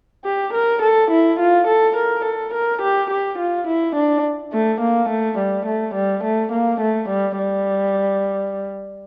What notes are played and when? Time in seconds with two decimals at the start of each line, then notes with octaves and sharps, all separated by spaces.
0.25 G4
0.54 A#4
0.82 A4
1.11 E4
1.39 F4
1.67 A4
1.96 A#4
2.25 A4
2.54 A#4
2.82 G4
3.11 G4
3.39 F4
3.67 E4
3.96 D4
4.53 A3
4.81 A#3
5.09 A3
5.38 G3
5.66 A3
5.95 G3
6.23 A3
6.52 A#3
6.81 A3
7.09 G3
7.38 G3